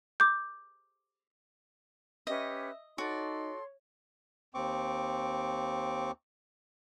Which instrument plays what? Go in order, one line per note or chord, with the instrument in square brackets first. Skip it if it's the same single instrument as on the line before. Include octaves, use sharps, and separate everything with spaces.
[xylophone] D6 G6
[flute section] C#4 G4 B4 [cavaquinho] D#5 [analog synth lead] E5
[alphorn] D#4 [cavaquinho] F#4 D5 [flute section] A4 C6 [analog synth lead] C#5
[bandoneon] D#2 C4 C#6 D6